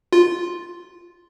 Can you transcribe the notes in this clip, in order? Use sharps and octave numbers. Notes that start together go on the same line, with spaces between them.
F4